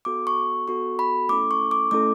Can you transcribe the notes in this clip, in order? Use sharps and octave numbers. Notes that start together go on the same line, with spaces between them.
B3 F#4 A4 D6
C#6
B3 F#4 A4 C#6
B5
A3 C#4 E4 A4 D6
C#6
D6
A3 C#4 E4 A4 D6